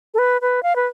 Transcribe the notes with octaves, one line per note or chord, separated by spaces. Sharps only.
A4
B4
B4
F5
B4